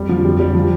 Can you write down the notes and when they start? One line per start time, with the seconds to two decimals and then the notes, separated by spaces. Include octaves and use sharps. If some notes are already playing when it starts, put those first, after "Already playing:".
Already playing: F2 G3
0.09 D3 F3
0.25 F2 G3
0.40 D3 G3
0.55 F3